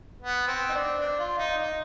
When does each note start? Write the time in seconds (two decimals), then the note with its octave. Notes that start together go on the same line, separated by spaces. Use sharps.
0.22 B3
0.48 C4
0.69 D#4
0.73 D4
0.99 D4
1.19 F4
1.38 D#4
1.58 D#4